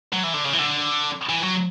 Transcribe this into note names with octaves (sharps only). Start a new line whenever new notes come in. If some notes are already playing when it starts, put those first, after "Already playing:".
F#3
E3
D3
C#3
E3
D3
E3
F#3